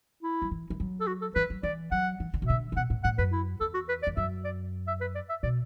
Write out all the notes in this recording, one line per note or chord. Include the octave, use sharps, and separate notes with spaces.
E4
F#3
E3
E3
F#3
A4
F#4
A4
E3 B4
F#3
E3 D5
F#3 F#5
E3
D3
B2
D3 E5
D3
B2 F#5
A2
A2 F#5
F#2 B4
E4
E2 A4
F#4
B4
D5
E2
F#2 E5
D5
E5
B4
D5
E5
B2 D5